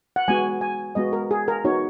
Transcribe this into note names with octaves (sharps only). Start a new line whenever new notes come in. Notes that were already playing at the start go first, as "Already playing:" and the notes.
F#5
G#3 B3 F#4 G#5
G#5
G#3 B3 F#4 D#5
A#4
G#4
A#4
B3 D#4 F#4 C#5